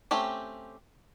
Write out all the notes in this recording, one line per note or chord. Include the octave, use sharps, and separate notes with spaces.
A3 C4 C#4 G4